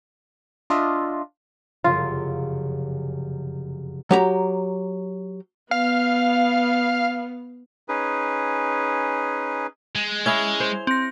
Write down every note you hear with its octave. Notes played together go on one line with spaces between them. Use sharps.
D4 F4 D#5 E5
F1 F#2 C#3 F4
F#3 G4 A#5
B3 F5
C#4 D#4 G#4 B4
G#3
C#4 E4 G#4 G#6 F7 G7
C5
C4 A#6